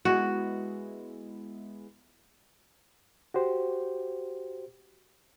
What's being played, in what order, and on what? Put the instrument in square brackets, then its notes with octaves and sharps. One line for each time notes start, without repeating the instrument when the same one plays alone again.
[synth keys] G#3 B3 E4 [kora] F#4
[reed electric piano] F#4 G4 C5